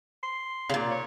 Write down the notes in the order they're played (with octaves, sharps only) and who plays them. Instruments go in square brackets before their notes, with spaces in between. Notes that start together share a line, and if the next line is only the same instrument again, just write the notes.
[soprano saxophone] C6
[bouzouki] A#2 C#3
[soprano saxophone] C#5